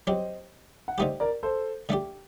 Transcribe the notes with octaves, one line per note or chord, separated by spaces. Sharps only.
F#3 C4 G4 C5 D#5
F#5
D3 A3 D#4 G4 C5 D#5
A#4 D5
A4 C5
D3 A3 D4 G4